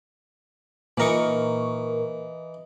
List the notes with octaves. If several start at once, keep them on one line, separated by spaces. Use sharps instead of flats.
A#2 E3 D#4 A#4 C#6